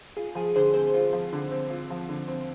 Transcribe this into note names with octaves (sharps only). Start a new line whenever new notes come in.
F4 G#4
F3 G#4
D3 G#4 C5
C4 G#4 C5
F4
F3
D3
C4
F4
F3
D3
C4